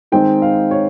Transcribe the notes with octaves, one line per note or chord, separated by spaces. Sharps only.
D#3 G#3 C4 D#4 G5
F5
C#5